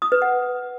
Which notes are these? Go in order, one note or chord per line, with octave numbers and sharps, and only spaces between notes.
D#6
B4
F#5